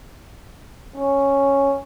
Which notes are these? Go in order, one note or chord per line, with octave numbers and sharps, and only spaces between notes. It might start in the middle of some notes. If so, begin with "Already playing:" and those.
C#4